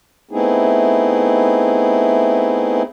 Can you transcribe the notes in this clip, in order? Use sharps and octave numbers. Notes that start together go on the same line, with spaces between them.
A3 B3 C4 D#4 E4 G#4